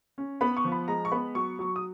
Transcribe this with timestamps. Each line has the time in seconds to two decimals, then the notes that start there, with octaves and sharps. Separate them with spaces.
0.18 C#4
0.41 B3 B5
0.57 C#6
0.64 F3
0.72 B5
0.88 G#3 A#5
1.05 C#6
1.12 B3 B5
1.35 F#3 C#6
1.59 F#3
1.76 D#6